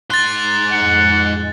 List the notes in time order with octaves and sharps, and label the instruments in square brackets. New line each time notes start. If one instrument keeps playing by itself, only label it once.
[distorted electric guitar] G#2 C6 [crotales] F#6 A6
[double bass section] F2 A2 G#3 [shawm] F#5